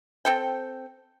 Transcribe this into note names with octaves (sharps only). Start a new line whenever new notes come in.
C4 A4 G5